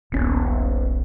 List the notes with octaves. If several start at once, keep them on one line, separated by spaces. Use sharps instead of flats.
D#1 A#1 B3 C#4